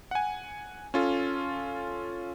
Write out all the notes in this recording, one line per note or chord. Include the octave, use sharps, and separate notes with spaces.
F#5 G#5
C#4 F4 A4